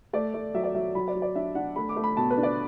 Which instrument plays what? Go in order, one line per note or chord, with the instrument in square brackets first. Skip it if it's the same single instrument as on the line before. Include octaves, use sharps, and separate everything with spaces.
[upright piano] A3 D5
A3
F#3 E5
D5
F#3 E5
F#3 B5
D5
F#3
D5
D4 E5
D4 F#5
A3 B5
D6
A3
B5
B2 A5
B4
D4
D5